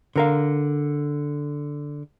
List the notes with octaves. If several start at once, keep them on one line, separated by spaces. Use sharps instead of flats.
D3 A#4 F5